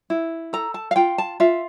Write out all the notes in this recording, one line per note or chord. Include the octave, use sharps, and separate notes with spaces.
E4
A4 A#5
A5
F5
F4 G5
A5
F4 E5